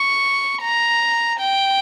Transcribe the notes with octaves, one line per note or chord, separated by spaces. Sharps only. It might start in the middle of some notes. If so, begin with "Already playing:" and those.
Already playing: C#6
A#5
G5